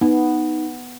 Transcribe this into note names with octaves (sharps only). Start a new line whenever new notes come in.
B3 D#4